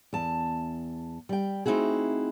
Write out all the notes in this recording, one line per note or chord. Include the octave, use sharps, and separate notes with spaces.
E2 A5
G3 G5
A3 C4 D#4 E4 F#4 G#4